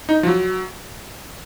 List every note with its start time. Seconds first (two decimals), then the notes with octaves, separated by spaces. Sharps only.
0.09 D#4
0.23 F3
0.27 F#3